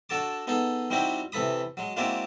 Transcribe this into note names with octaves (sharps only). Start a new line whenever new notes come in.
D4 F#4 A4 A5 D6
B3 D#4 G#4 A4
G3 C4 D#4 E4 F#4 G4
C3 E3 A4 B5 D#6
F#3 G#3
G#3 A#3 C4 E4 F#4 D5